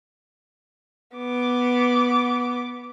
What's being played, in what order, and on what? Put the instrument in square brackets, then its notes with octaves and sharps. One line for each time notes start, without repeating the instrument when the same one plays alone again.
[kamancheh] B3 D6